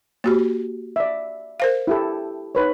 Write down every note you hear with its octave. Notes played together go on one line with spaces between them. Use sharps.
A#3 F#4 G4
D5 E5
A#4 C5 F5
E4 G4 A4
D#4 B4 C#5